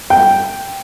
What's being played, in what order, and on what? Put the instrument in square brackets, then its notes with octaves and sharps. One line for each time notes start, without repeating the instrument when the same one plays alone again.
[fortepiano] G5